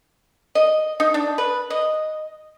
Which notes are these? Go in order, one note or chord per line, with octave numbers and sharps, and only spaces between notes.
D#5
D#4
D4
B4
D#5